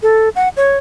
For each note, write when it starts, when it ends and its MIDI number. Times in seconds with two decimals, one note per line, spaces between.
0.03 0.29 69
0.36 0.49 78
0.57 0.78 73